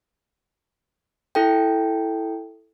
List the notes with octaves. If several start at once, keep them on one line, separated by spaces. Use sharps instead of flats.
E4 A4 G5